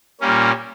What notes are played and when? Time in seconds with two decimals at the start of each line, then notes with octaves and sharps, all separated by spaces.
0.20 A#2 G3 A#3 C#4